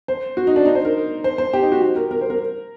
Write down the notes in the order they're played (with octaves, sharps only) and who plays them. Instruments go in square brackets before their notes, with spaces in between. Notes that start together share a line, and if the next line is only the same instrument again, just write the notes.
[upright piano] C5
F#4
D#4
D4
D#4
C5
A#4
C5
C5
G4
D#4
F#4
G4
A#4
A#4
C5
A#4